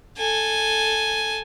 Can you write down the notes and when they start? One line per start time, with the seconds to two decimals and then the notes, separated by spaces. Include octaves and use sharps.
0.18 A4 G#5